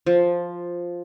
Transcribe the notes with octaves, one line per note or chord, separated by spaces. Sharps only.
F3